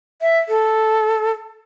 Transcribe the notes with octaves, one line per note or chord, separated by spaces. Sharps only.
E5
A4